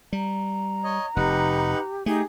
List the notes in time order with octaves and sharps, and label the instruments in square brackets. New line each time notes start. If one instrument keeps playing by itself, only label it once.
[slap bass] G3 [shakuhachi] A#5
[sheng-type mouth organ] C#5 D#5
[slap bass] F1 [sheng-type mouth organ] D#4 B4 F#5 [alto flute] G4
[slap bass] A3 [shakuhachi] D#4 [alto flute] G4 [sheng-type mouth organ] G#4